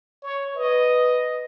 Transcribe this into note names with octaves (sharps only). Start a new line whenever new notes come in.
C#5
B4 D#5